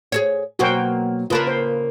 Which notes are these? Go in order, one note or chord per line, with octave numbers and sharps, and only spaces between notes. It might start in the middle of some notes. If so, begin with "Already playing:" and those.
G#4 A4 C#5
B2 F#3 A#3 F#4 C5 G5
C#3 A#3 F4 A#4 B4 A5
C5